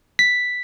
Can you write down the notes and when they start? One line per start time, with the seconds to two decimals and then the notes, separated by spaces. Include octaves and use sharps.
0.19 B6